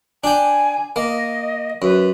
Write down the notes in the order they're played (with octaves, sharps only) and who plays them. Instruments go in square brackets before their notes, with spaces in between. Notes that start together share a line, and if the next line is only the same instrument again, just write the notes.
[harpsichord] D4 G5 [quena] G#5
[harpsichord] A#3 [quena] D#5
[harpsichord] F#2 [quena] B4